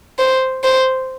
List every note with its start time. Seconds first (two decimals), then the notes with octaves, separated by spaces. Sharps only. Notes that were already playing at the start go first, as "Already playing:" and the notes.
0.19 C5
0.64 C5